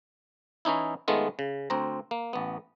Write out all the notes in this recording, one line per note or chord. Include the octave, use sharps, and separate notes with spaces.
E3 C#4 D#4 E4
D#3 G#3 A3 B3 F4
C#3
D2 C4 A#5
A#3
A1 B3